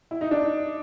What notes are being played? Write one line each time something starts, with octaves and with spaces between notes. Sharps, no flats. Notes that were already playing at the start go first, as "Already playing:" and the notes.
E4
D#4
D4